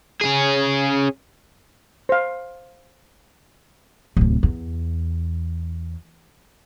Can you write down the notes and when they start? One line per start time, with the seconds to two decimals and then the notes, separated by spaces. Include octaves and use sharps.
0.21 C#4 G#4
2.09 C5 F5
4.17 D1 C3
4.43 E2